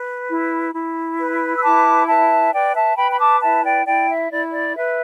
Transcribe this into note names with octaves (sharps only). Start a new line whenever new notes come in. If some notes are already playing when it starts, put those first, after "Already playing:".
Already playing: B4
E4
E4
B4
E6
E4 A5 D6
B4 E5 A5
B4 D5 G5
E5 A5
B4 G5 B5
B5
A5 D6
E4 E5 A5
D5 G5
E4 D5 G5
E5
E4 D5
D5
B4 E5